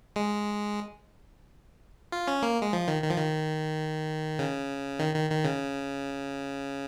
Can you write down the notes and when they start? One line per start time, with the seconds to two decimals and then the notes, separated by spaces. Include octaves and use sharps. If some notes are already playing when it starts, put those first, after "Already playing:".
0.16 G#3
2.12 F4
2.28 C#4
2.42 A#3
2.62 G#3
2.73 F3
2.88 D#3
3.03 D#3
3.10 F3
3.18 D#3
4.39 C#3
4.99 D#3
5.15 D#3
5.30 D#3
5.44 C#3